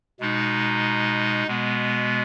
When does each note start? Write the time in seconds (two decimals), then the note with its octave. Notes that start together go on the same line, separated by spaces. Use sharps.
0.20 B2 G#3 D#4
1.47 B2 G#3 B3